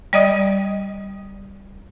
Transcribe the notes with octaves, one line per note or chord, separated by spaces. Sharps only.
G3 D5 D#5 D#6